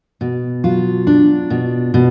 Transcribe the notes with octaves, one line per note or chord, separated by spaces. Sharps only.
B2
F#3 F4
D4
B2
B2